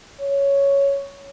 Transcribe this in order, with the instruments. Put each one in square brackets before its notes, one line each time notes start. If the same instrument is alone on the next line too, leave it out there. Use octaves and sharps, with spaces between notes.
[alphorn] C#5